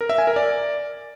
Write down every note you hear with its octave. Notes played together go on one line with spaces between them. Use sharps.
A#4
E5
G#5
A#4
D5